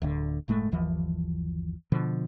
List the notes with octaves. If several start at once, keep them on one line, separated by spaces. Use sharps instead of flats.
D1 D2 D3
F#1 A2 G#3 A3
G1 D#2 E3 F3
B2 D3 F3